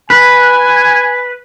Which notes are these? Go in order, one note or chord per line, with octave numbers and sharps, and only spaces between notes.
B4 G#5